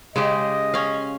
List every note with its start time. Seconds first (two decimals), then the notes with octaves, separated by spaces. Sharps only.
0.16 C#3 G#3 G4 D#5
0.74 C#4 F5